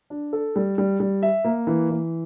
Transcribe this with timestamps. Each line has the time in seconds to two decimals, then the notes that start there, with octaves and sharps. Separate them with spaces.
0.10 D4
0.33 A4
0.56 G3
0.78 G3
1.00 G3
1.23 E5
1.44 A#3
1.67 E3
1.90 E3